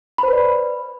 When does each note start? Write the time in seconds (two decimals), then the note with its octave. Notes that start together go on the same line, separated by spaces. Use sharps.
0.18 B5
0.23 C5
0.28 B4
0.33 D5